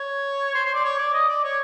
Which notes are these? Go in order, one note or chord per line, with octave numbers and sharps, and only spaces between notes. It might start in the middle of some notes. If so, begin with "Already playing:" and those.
Already playing: C#5
C5
C5
D5
C#5
D5
D#5
D5
C#5